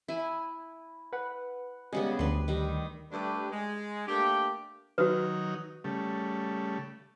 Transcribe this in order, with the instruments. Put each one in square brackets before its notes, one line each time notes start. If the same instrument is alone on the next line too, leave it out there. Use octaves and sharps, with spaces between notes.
[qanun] E4 G#5
[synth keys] B4 F#5
[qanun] C#3 G3 B3 [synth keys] G#3
[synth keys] D2 [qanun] B4 C6
[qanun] D#3 G3
[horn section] G2 G3 A3 D4 G4 B4
G#3
A3 A#3 D4 G4
[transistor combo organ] D#3 F#3 D#4 [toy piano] F#4 B4
[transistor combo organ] C#3 G3 A3